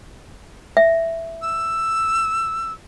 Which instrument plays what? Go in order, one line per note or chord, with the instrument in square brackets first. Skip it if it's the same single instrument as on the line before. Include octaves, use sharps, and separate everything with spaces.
[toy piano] E5
[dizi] E6